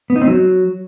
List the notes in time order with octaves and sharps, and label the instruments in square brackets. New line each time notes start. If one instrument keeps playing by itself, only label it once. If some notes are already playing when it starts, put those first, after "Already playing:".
[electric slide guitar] B3
D#4
C4
F#3